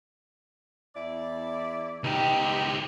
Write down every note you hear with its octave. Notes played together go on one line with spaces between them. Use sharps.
E2 E4 D5
C#2 G3 B3 D#4 G4